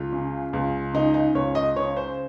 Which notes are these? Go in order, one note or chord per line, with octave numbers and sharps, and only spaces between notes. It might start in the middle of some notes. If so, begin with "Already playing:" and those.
Already playing: C#2 F4
C#3
C#2
C#3 D#4
D#4
C#2 C#5
D#5
C#3 C#5
C5